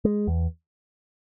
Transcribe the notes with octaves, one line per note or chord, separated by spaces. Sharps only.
G#3
E2